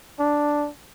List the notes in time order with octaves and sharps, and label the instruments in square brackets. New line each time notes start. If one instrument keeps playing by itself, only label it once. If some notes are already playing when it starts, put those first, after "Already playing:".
[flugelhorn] D4